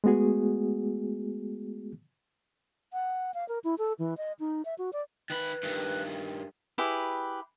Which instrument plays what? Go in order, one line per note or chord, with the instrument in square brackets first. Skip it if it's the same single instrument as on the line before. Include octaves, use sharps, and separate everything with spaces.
[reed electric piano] G#3 A3 B3 F#4 G#4
[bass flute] F#5
F5
A#4
E4
A4
E3
D#5
D#4
E5
F#4
D5
[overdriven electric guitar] D#3 B5 [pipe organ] B4 F#6
[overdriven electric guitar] G2 D#3
[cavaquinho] E4 G4 G#4 B4